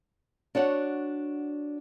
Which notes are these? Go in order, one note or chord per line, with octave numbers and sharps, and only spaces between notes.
D4 F#4 C#5 F#5